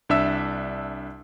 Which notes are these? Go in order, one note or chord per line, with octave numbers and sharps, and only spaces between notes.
C2 D4 E5 E6